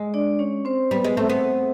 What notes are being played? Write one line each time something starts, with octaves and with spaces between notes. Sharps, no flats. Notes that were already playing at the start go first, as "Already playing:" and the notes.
Already playing: G#3
D4 D5
C#4 C#5
C4 C5
G3 B3 B4
G#3
A3 C4 C5
B3